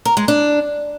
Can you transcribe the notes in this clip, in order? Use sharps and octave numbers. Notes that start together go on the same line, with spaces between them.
A#4
G#3
D4